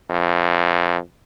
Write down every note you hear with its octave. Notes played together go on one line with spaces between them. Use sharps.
F2